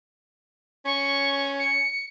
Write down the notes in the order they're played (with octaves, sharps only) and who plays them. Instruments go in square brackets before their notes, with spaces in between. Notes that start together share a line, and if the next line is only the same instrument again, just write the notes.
[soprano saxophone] C#4 [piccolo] C#6
[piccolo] C#7